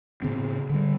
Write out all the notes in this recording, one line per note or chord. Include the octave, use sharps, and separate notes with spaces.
A2 C#3 B3 C4
D3 G3